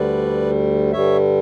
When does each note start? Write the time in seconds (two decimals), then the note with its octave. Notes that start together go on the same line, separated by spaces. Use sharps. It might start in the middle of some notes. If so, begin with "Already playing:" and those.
Already playing: D2 D3 G3 B4 D5
0.92 G2 D3 G3 C#5 E5